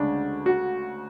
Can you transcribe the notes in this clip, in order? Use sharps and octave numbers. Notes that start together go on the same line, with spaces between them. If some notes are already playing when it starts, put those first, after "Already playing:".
Already playing: D2 C#3 G#3 D4
F#4